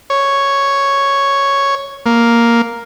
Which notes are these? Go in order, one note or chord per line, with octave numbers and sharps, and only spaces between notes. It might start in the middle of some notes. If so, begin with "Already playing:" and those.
C#5
A#3